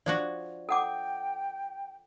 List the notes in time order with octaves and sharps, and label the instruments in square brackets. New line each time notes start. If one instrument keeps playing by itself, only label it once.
[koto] F3 D4 F#4 [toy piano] D5
[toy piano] A4 F#5 D6 [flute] G5